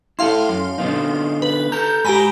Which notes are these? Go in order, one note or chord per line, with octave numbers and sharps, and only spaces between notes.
E4 G4 A4 F5 C6
F#2
D3 B3 D#4
B4
A4 A5 A#5 G6
G#2 G4 G#5 A#5 B5